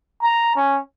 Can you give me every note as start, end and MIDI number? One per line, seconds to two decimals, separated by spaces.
0.22 0.55 82
0.56 0.79 61